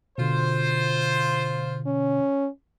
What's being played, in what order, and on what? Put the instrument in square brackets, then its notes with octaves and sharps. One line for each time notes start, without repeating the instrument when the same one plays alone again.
[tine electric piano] B2 D3 [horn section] F4 C5
[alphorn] C#4